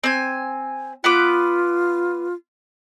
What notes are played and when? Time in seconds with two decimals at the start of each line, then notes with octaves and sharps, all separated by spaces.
0.04 C4 G#5
1.04 B3 F4 B4 D6